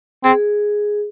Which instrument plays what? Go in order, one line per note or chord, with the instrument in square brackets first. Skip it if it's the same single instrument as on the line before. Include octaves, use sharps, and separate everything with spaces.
[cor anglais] C4 [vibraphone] G#4